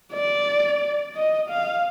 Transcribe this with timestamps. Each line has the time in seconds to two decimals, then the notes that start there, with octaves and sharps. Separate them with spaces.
0.13 D5
1.16 D#5
1.49 F5